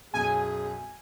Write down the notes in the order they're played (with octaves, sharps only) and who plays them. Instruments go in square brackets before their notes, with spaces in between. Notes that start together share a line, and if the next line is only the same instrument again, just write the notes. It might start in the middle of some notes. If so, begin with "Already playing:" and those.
[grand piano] B1 F#2 [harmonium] G#4 [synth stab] G#5